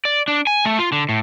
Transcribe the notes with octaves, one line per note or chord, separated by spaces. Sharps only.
D5
D4
G#5
A3
F4
D3
A2